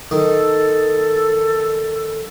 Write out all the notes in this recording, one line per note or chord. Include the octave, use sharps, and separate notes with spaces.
D#3 A4